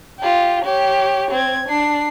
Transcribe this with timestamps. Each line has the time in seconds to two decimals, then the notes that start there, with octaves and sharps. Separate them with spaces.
0.19 F4 G4
0.64 G4 C#5
1.31 C4 G#6
1.68 D4 C7